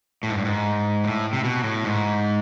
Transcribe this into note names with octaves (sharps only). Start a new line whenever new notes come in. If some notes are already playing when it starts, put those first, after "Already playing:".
A2
G#2
G2
G#2
A2
C3
B2
A2
G#2